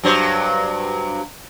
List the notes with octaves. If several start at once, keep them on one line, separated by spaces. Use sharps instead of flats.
G2 F#3 C5